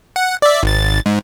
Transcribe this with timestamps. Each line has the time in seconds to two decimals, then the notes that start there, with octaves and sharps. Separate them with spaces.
0.16 F#5
0.42 D5 E5
0.63 G#1 A6
1.06 G#2